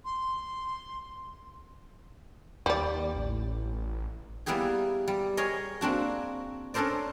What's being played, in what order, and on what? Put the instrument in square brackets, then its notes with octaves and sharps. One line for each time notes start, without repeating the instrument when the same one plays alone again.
[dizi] C6
[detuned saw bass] D#2 [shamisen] G3 D5
[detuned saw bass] A1
[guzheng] G3 A#3 B3 E4 G4 G#4
G3
G#4 A#4 C#5 D#5
A#3 C4 D4 F#4
C#4 D4 A4 A#4 C5 D5